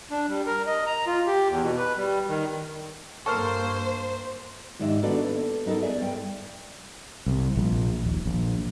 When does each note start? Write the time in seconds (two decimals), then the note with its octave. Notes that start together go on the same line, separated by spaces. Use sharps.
0.11 D4
0.28 G3
0.47 A#4
0.67 D#5
0.87 A#5
1.07 F4
1.27 G4
1.48 E2
1.62 B2
1.78 B4
1.96 G3
2.28 D#3
3.26 G2 A#3 A4 A#4 C5 C#6 F6
4.79 G#2 D#3 D4 G4 D#5 E5
5.02 A#3 B3 D4 F#4 A4 D5
5.25 A4
5.66 B3 D#4 F4 A4 A#4
5.82 G#4 D5 E5 G#5
6.01 G2 G5
7.26 C2
7.56 A#1
8.04 D#1
8.26 A#1